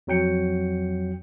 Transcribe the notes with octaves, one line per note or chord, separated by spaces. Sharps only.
F2 F#3 G5 C#7